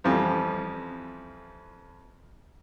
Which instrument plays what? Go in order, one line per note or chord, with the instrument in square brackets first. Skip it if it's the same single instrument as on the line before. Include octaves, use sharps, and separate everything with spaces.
[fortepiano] F2 E3 F3 G3